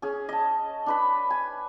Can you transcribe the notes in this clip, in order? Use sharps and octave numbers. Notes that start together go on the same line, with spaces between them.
C#4 G#4
D#5 A5
D4 B4 B5
G#5